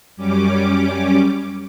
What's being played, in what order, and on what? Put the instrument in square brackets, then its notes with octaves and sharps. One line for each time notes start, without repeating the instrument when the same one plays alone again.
[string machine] F#2 G3 C#4 D6